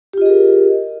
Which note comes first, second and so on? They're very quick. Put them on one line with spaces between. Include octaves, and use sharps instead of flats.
G4 F4 D#5 G#4 A#4